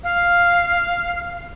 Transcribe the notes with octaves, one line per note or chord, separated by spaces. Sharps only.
F5